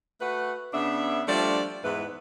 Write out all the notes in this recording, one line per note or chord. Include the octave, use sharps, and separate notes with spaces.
A3 F#4 B4
C#3 B3 D4 E5
F3 G3 A3 D4 D5
E2 G#2 E4 B4